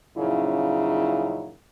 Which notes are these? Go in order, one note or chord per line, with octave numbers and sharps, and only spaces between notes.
F#2 A#2 C#3 F3 D#4 E4